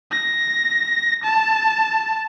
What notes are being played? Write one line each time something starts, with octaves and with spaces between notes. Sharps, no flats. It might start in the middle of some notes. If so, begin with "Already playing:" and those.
A#6
A5